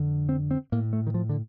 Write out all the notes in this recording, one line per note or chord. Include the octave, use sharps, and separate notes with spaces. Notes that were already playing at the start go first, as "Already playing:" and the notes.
Already playing: F2 D3
C4
C4
A2 A#3
A3
D#3
F3
D3